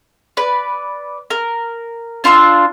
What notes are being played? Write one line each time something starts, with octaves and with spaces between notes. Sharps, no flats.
B4 D5
A#4
D4 F4 C6 E6